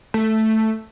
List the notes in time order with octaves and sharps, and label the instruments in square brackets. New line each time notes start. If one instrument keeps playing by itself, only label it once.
[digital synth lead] A3